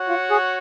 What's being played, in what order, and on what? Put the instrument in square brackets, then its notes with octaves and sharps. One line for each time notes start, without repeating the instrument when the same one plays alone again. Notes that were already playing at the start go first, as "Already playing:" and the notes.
Already playing: [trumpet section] F#4 C#5 F#5
[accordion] F4
G#4